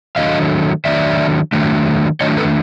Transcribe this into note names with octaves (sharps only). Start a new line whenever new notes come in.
D#3 F#3 A3 D4 D#5 F5
D#3 F#3 A3 D4 D5 E5
D#3 F#3 A3 D4
D#3 F#3 A3 D4 C#5 D#5
A4 B4